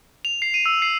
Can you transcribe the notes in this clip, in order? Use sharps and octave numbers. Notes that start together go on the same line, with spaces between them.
F7
C7
D#7
E6
C7